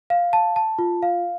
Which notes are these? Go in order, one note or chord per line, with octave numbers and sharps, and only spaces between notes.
F5
A5
A5
F4
F5